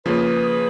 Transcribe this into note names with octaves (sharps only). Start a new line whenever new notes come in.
C#3 F3 A#3 F4 G#4 B4